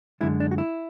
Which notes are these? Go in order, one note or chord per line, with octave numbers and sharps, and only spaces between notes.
F#2 D3 G#3 E4
D4
F#4
E4